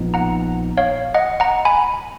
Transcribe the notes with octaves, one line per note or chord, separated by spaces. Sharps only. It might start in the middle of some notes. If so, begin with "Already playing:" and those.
Already playing: A#1 A#2 F3 B3 D#4
F#5 A#5
C#5 F5
D#5 F#5
F#5 A#5
G#5 B5